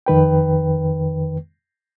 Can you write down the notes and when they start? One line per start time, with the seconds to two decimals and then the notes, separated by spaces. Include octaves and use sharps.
0.06 F2 D#3 B4 G5